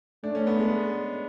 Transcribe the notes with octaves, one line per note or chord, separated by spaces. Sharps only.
A3 D4
C#4
B3
G#3